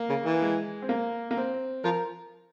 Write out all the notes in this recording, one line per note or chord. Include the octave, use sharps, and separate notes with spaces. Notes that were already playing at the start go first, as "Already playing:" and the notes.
Already playing: A#3
C#3
E3
G#3
C4
A#3
A#3
C4
F3 A#4